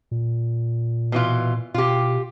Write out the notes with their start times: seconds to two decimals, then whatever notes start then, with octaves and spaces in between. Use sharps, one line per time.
0.11 A#2
1.12 B2 E3 F4
1.74 B2 F4 G4